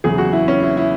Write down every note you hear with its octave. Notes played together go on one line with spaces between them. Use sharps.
E2 C#3 F#3 G#4
F#4
E4
C#4
E4
E4